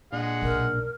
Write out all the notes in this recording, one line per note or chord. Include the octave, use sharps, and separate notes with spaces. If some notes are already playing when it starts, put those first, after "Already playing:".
A#2 G#3 D4 F#5
B1 A#4